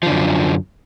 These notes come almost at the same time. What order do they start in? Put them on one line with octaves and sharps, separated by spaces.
F3 D3 F#2